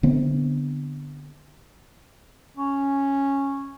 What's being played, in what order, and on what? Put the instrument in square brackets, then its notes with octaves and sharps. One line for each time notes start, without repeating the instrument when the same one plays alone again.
[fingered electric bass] D3 B3 C4
[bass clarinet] C#4